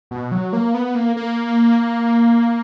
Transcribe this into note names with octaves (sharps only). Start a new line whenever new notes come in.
B2
F#3
A#3
B3
A#3
A#3